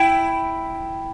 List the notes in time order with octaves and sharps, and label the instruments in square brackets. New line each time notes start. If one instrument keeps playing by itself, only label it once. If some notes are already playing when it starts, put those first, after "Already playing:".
Already playing: [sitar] E4 [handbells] G5